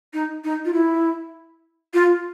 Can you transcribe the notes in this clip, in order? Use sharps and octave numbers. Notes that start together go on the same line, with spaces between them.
D#4
D#4
F4
E4
F4